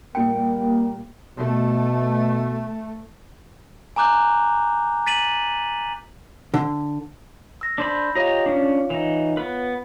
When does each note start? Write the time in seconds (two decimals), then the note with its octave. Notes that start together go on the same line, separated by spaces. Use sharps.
0.15 A#2 G3 A#3 G5 C#7
1.39 B2 A3
3.96 G#5 A#5 D6 F#6 G6
5.06 A6 B6 D#7 F#7
6.54 D3
7.61 E6 A#6
7.78 D4 C5 B5
8.15 F4 G4 C#5 D#5 F5 A#5
8.46 C#4 D4
8.90 E3 D#4
9.37 B3 B4